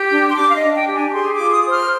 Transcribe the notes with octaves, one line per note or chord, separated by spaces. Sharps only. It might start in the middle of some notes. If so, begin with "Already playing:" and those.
Already playing: G4
D4
C6
D4 D6
F5
D#5
D4
G5
G4
G#5
D6
G#4 C6
D6
F4
D#6
C5
F6